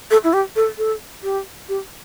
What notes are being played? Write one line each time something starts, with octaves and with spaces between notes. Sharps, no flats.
A4
E4
G4
A4
A4
G4
G4